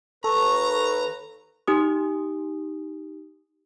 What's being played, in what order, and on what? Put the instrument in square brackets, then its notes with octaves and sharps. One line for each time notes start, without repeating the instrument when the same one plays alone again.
[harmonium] D#2 B4 [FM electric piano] A4 [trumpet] A#5 [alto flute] C#6
[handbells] D#4 G4 D#6